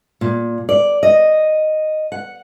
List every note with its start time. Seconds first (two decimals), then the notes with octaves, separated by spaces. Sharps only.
0.21 A#2
0.69 D5
1.03 D#5
2.12 F#5